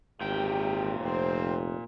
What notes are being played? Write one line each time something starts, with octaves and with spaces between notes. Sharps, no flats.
G#1 E2 A#2 G4 G5
F1 C4 C5